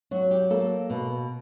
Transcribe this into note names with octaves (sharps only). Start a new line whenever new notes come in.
F#3 F#4
G4
A#3 A4
B2